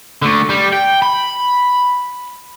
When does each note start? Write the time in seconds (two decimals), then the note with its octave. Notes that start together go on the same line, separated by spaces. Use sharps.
0.22 D3 A3
0.49 G3
0.73 G5
1.02 B5